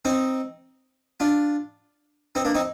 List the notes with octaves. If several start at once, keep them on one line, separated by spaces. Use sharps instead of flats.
C4 D#4
D4 F4
C4 D#4
A#3 D4
C4 D#4